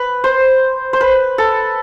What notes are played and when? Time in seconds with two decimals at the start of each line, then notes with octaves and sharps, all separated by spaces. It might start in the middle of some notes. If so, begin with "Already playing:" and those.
Already playing: B4
0.24 C5
0.93 C5
1.01 B4
1.38 A4